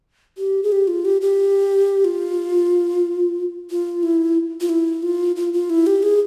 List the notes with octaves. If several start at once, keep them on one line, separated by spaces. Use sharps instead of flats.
G4
G#4
G4
F4
G4
G4
F4
F4
E4
F4
E4
F4
F4
F4
E4
G4
G#4